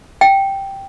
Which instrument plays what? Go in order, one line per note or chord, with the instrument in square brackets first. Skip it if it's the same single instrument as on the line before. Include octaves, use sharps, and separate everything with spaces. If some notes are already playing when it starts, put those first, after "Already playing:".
[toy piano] G5